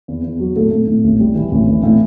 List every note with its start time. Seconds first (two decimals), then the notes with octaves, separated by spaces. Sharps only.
0.08 E2
0.24 E2
0.40 F#3
0.56 A2 A4
0.71 A2
0.87 A2
1.04 A1
1.20 G3
1.35 E3
1.52 A1
1.68 E3
1.83 A2